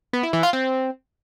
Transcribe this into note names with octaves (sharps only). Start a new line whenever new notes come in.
B3
E4
E3
F4
C4